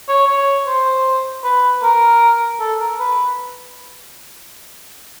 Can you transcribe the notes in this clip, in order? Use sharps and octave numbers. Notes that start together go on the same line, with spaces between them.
C#5
C#5
C5
B4
A#4
A4
A#4
B4